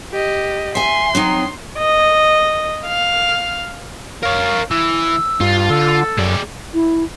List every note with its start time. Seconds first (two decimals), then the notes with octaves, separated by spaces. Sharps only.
0.12 G4 D#5
0.75 E5 G#5 C6
1.15 F#3 C4 D#4
1.78 D#5
2.86 F5
4.23 A#4 C#5 F5
4.71 E3 E6
5.41 G2 F4
5.70 D3 A4
6.18 F#2 G#3 D5
6.74 E4